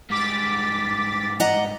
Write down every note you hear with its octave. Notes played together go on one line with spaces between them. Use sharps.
G#2 G3 D6 A6 B6
D#5 F#5 A#5